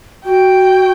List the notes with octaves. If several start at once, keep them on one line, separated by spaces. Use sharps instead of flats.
F#4 G5